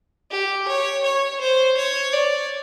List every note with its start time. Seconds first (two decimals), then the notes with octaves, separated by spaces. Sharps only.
0.31 G4
0.68 C#5
1.04 C#5
1.40 C5
1.77 C#5
2.13 D5